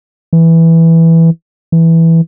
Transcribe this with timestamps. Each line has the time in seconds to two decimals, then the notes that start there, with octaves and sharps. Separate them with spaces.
0.33 E3
1.72 E3